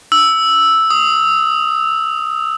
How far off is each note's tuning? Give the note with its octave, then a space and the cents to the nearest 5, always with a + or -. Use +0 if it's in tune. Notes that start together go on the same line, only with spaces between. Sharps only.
E6 -5
D#6 +10